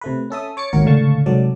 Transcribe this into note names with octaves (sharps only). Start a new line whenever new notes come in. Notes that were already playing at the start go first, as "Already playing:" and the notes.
C3 A3 B4
C#4 A4 E5 D#6
C#5 D6 A6 C#7
G#1 D#2 F#4 A#4 C#5 C#7
C#2 A2 D3 F5 A5 C#6
C2 G#2 F#3 A4 D5